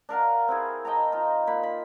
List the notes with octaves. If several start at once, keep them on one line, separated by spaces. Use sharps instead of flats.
D4 A#4 F5 F#5
C4 E4 G#4
D#5 G5 A5 A#5
D#4 F4
A#2 B5
B5